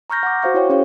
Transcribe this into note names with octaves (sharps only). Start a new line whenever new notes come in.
A#5 C#6 F6 G6 A#6
F#5 D6
F#4 C5 F5 C#6
E4 F#4 C#5 G5
C#4 F#4 G#4 C#5 F5